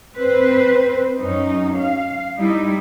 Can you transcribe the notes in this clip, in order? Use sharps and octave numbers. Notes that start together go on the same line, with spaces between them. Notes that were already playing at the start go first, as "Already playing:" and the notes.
C4 B4 C5
F#2 C#4 D#4
F5
G3 D#4 E4